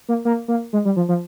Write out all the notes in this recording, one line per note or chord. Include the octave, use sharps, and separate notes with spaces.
A#3
A#3
A#3
G#3
G3
F3
F3